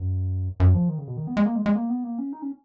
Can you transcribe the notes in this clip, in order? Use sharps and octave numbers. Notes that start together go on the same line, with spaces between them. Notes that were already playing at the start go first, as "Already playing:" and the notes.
Already playing: F#2
F#2
F3
D#3
C#3
B2
D#3
B3
G#3
A#3
G#3
G#3
A#3
B3
A#3
C#4
D#4
C#4